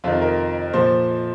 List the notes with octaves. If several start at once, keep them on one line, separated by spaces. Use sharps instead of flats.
F2 C3 D#3 F4
A#4
A#2 F3 C5